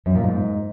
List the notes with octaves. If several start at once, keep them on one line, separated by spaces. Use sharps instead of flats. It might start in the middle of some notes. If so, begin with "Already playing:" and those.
F#2
A#2
G#2